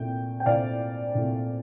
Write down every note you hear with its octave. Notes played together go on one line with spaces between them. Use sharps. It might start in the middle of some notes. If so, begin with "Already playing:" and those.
Already playing: C2 A#2 A3 G5
G5
C2 A#2 A3 D5 F5
C2 A#2 A3